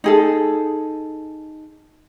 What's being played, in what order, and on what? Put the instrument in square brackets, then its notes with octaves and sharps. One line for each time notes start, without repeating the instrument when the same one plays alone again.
[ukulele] D#4 G#4 A4